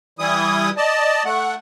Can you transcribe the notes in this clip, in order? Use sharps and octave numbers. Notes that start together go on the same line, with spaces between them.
E3 G3 E4 D#6
D5 D#5 A5
A3 F#5